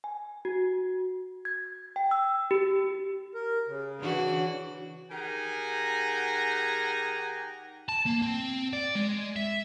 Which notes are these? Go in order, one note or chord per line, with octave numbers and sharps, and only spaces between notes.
G#5
F#4
G#6
G5
E6
G4
A#4
C#3
D3 E3 F#4
D#3 G4 G#4 F#5 G#5 A#5
A5
A#3
C4
D5
G#3
E5